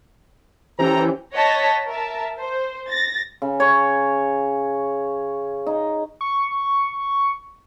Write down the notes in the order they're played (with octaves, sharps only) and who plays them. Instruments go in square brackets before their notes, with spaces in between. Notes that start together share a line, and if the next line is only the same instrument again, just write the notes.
[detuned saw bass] E3 [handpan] C#4 G4 C5 [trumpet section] A4 G5 A#5
[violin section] C#5 D#5 F#5 A5 A#6 B6
A#4 E5 A5
C5
A6 A#6
[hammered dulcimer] C#3
C#5
D#4
[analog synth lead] C#6